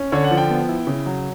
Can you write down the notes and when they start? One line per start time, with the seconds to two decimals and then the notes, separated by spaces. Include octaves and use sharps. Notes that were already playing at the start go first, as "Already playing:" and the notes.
Already playing: C#4
0.12 D3 C#5
0.24 F#5
0.31 F3
0.38 G5
0.49 B3
0.68 E4
0.87 C#3
1.06 F#3